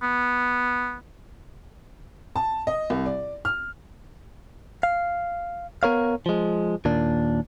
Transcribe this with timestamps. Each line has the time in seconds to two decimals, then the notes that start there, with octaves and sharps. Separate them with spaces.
0.02 B3
2.36 A5
2.67 D#5
2.90 C2
3.06 D5
3.45 F6
4.83 F5
5.83 B3 A#4 C#5 F5
6.26 F3 G#3
6.85 D#2 A#2 D4